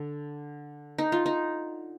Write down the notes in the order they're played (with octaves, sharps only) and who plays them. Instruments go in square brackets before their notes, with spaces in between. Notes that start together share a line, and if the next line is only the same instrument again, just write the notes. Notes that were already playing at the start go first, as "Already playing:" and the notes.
Already playing: [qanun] D3
D#4
F4
D#4